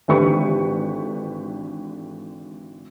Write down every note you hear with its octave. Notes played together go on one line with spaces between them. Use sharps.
G#1 D3 E3 G4 B4 C#6